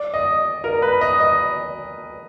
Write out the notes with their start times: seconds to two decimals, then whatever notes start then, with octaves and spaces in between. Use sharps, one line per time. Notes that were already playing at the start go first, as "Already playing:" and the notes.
Already playing: D5
0.14 D#5
0.64 A#4
0.82 B4
1.01 D#5
1.21 D#5